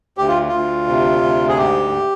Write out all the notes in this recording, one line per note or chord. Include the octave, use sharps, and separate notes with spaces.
D2 G4
F4
D2 F4
C3
D2
G#4
G#2 G4